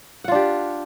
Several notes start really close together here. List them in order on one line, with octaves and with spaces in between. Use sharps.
F#5 F4 D4 G4